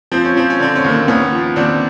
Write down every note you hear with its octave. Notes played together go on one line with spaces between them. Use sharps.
F3 C4
C#4
F3 C4
C#4
D3 C4
C#4
D#2 A#3 C4
D#2 B3 C#4
F3
D#2 C4 D4